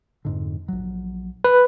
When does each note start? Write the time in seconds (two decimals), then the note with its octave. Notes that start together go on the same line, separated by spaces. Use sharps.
0.25 F2 G#2 D3
0.68 A#1 F#3
1.44 B4